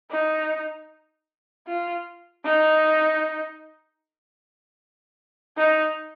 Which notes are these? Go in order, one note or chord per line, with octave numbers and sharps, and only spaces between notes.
D#4
F4
D#4
D#4